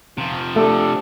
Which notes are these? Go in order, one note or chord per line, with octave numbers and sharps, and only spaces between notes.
C3 F3
A3 D4 G4 A4